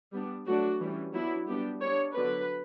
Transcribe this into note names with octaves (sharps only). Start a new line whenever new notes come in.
G3 B3 D4
F#3 A3 D4 F#4
E3 G3 C#4
F#3 B3 D4 E4
G3 B3 D4 G4
G3 D4 C#5
D3 F#3 B3 D4 B4